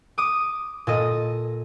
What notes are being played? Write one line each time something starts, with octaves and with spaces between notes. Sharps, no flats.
D6 D#6
A#2 A4 D#5